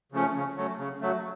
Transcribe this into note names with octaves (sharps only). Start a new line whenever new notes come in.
C#3 F3 A3 C#4
C#3
F#3 A3
C#3
F#3 A3